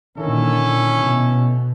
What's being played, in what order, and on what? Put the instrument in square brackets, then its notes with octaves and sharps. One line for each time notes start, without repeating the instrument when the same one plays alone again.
[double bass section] A#2 D3 D#3 [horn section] C#4 E4 A4
[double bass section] B2